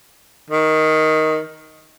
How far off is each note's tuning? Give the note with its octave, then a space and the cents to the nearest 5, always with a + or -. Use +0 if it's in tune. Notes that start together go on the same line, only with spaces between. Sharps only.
D#3 +10